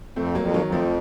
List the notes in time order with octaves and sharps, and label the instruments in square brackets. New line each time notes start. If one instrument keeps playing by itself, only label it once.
[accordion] F2 [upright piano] A3 C4
[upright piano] F#3 A#3
[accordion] F2
[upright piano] D#3 F#3
[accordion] F2
[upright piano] F3 A3